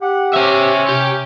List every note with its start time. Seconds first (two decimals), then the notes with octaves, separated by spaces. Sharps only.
0.02 G4 F#5
0.34 C#4 C5 E5
0.89 C3 G4